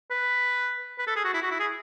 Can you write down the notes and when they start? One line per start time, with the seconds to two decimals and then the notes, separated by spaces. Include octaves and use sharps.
0.11 B4
0.99 B4
1.07 A4
1.16 G#4
1.25 F#4
1.34 E4
1.42 F#4
1.51 E4
1.60 G#4